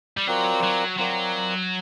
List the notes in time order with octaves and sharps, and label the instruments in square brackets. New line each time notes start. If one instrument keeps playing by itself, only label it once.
[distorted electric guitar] G3
[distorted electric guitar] F#3 [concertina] C4 F4 A#4 D5 G5
[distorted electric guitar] F#3
[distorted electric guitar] F#3 [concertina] C4 F4 A#4 D5 G5